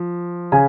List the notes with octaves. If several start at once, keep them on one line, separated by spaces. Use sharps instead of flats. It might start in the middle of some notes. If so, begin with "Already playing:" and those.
Already playing: F3
C#3 G#5